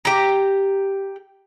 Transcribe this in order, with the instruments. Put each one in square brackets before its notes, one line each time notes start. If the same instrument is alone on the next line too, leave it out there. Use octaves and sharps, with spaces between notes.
[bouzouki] G4 A#5